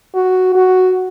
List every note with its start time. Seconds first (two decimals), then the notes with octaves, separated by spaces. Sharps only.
0.15 F#4
0.55 F#4